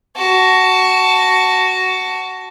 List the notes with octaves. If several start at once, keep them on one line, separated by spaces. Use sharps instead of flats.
F#4 A5